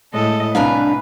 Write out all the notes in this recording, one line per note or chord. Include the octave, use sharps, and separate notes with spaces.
A2 G#3 A4 D#5
C2 D4 B4 F5 G#5 A#5